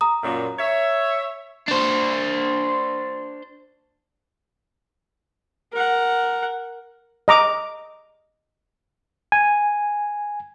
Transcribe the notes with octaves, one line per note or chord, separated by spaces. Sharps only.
A#5 D#6
F#2 A#2
C#5 E5
D4 C5
A#4 F#5
D#5 A#5 D6
G#5